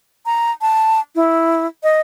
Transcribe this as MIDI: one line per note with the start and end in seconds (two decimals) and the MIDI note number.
0.26 0.51 82
0.62 1.01 81
1.15 1.67 64
1.83 2.01 75